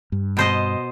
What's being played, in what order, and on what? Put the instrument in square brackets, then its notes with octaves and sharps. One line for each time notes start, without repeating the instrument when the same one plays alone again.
[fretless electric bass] G2
[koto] B2 C5 D#5